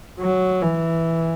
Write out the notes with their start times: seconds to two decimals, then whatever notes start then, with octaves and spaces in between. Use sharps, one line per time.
0.21 F#3
0.62 E3